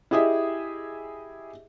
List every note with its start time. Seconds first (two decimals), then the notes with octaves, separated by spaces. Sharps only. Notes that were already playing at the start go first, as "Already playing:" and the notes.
0.11 E4 G4 G#4 D#5 E5